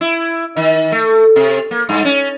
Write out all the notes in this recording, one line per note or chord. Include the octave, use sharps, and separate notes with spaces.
E4
D#3
A3
C3
A#3
G2
C#4